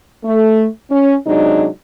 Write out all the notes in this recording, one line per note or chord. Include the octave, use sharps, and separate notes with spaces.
A3
C#4
C3 F#3 G#3 D4 D#4